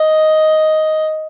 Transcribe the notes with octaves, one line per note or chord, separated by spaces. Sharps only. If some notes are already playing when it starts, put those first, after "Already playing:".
Already playing: D#5